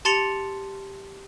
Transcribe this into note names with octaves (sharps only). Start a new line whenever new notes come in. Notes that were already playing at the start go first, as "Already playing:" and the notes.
G4 A5 C6 A6 C#7 F7